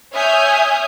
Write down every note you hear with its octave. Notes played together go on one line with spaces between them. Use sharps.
C#5 E5 G#5 D#6 F6 G6